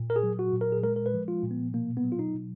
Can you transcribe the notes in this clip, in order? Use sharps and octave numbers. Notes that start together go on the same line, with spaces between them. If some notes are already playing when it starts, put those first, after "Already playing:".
Already playing: A#2
A#4
G#4
F#3
F#4
A#2
A#4
G#4
G#3 A#4
A#4
B4
F3
F4
A#2
B3
B2 A#3
B3
F#3
F4
D#4
B2